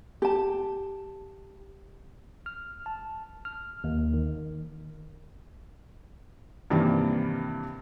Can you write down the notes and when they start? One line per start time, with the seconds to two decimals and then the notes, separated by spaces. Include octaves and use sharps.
0.22 G4 A5
2.46 F6
2.86 A5
3.45 F6
3.84 D#2
4.13 D#3
6.70 G2 C3 D#3 E3 G3 A#3